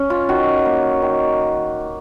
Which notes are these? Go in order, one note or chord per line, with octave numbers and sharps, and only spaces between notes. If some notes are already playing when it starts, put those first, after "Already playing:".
Already playing: C#4
F4
D#3 F#4
A#3
D#3